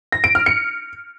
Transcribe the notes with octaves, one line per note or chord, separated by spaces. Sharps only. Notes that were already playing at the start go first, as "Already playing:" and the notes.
A#6
D7
F6
C#7